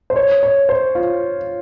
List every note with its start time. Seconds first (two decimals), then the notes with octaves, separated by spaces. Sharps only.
0.10 C5
0.16 C#5
0.43 C#5
0.69 C5
0.95 F4